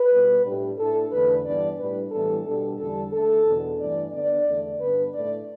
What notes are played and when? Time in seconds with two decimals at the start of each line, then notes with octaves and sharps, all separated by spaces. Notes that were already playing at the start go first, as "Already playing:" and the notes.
Already playing: B4
0.11 B2 G3 B3
0.45 A2 G3 D4
0.78 A2 A3 D4 A4
1.12 E2 D3 A3 D4 B4
1.45 G2 E3 B3 D4 D5
1.78 A2 G3 D4 B4
2.12 A2 E3 G3 B3 D4 A4
2.45 B2 G3 D4 A4
2.79 E2 D3 G3 D4 A4
3.13 D3 A3 D4 A4
3.46 E2 B2 B3 D4
3.79 G2 E3 A3 D4 D5
4.13 D3 B3 D4 D5
4.46 E2 D3 A3 D4
4.80 G2 D3 B3 D4 B4
5.13 A2 A3 D4 D5